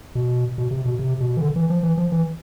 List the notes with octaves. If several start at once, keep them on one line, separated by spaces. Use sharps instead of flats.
B2
B2
C3
B2
C3
B2
E3
D3
E3
F3
E3
F3
E3